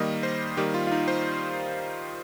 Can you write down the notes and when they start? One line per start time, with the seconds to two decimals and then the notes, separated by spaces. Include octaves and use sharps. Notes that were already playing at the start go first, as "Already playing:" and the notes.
Already playing: D#3 G3 A#3 D#5
0.23 C5
0.57 D#3 G3 A#3 G4
0.74 F4
0.87 F4
0.91 D#4
1.08 C5